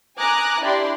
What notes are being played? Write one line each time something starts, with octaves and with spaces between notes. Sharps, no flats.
G#5 A#5 D6 D#6 F#6
D4 E4 G4 D5 C6